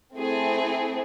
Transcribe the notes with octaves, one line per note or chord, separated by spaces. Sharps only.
A3 C4 E4 G#4